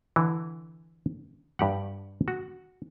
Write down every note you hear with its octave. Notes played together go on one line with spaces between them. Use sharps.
D3 E3
G2 G4 F#5
F#4